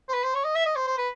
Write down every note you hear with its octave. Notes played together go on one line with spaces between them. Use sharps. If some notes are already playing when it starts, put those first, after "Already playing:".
C5
B4
C5
C#5
D#5
E5
D#5
C5
C5
B4